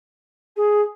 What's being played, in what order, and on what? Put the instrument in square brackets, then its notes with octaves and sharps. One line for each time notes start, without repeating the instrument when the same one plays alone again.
[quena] G#4